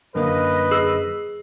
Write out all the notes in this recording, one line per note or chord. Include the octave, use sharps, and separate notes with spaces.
F#2 D3 A#3 A#4 B4 D#5
G#4 E6